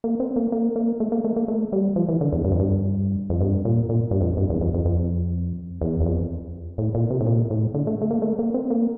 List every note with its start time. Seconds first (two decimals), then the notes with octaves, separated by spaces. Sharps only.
0.04 A#3
0.20 C4
0.36 A#3
0.52 A#3
0.76 A#3
1.00 A3
1.12 A#3
1.24 A3
1.36 A#3
1.48 A3
1.72 G3
1.96 F3
2.09 E3
2.21 D3
2.32 E2
2.44 G2
2.52 F2
2.60 G2
3.30 F2
3.41 G2
3.65 A#2
3.89 A#2
4.11 G2
4.21 F2
4.37 G2
4.49 E2
4.61 F2
4.74 F2
4.85 F2
5.81 E2
6.00 E2
6.06 F2
6.78 A2
6.95 A#2
7.10 C3
7.21 A2
7.26 A#2
7.50 A2
7.74 D3
7.87 A3
8.01 A3
8.11 A#3
8.22 A3
8.39 A#3
8.54 C4
8.70 A#3